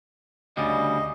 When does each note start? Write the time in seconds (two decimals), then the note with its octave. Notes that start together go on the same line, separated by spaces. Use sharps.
0.57 D2 C#3 G3 D#5